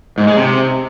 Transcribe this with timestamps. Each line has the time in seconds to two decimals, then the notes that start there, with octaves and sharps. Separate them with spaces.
0.18 G#2
0.27 G#3
0.37 C3